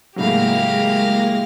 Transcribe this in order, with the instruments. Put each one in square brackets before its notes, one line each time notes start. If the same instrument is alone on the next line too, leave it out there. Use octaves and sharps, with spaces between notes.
[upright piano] A2 C#3 F#3 [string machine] G#3 A#3 A#6 [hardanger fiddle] G4 F5